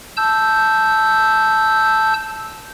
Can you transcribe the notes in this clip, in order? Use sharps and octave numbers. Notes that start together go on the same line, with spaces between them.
A5 E6 G6